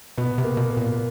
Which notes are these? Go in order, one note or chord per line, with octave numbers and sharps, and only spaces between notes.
B2 B3
C3
A#3
B2
A#3
A#2